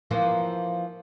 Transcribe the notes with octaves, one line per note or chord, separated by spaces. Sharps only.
E3 F3 A#3